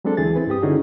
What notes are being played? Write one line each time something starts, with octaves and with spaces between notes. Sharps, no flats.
F#3 G#3 C4 D4 A4
D2 E3 G#4 A6
C4 E4 B4
G2 C4 G4 D#6
D3 C#4 D#4 E4 F#4 G#4